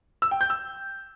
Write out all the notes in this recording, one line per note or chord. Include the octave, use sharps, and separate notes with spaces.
E6
G5
G6
E6